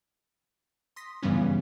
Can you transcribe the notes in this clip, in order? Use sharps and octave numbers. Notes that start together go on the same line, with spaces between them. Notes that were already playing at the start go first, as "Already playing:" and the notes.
C6 D#6 A#6 B6
G2 C#3 E3 G3 B3 C#4